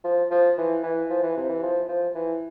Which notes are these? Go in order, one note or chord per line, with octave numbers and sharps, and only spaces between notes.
F3
F3
E3
E3
F3
E3
C3
E3
F3
F3
E3